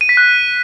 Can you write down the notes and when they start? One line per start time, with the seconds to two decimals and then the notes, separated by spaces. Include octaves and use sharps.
0.01 D#7
0.09 B6
0.17 F#6